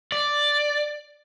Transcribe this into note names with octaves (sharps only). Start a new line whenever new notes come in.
D5